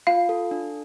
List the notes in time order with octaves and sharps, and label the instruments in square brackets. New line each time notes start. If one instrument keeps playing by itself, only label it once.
[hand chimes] F4 [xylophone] F5
[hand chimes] A4
D4